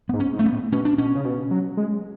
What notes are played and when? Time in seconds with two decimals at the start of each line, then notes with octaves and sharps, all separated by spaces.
0.09 G#2 B3
0.20 C#4
0.33 G#2
0.39 A3
0.46 B3
0.53 A2
0.72 B2 C#4
0.85 D4
0.98 B2 C#4
1.15 C#3
1.25 B2
1.51 F#3
1.77 G#3